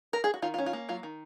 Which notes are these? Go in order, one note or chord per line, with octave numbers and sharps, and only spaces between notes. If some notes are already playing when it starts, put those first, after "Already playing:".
A#4
G#4
F#4
D#3 F4
F4
C#4
F4
A#3
F#3 F4
D#3